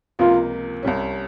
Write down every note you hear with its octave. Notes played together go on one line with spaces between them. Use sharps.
C#2 C3 F3 A#3 F4
C2 C3 G3 C#4